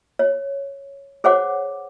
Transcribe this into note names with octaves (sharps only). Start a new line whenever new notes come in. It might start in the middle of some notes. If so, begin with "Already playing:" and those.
C#5
G#4 C5 C#5 F#5 D6